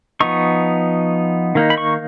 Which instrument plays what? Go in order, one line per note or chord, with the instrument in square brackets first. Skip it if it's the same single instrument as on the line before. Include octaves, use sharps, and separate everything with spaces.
[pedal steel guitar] F3 B3 D#4 C#6
D#3 A#3 D#4
B5
C#6